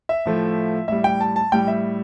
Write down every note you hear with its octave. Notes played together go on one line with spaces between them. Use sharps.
E5
A2 F3 A3
A2 G3 E5
G5
A5
A5
A2 G3 G5
E5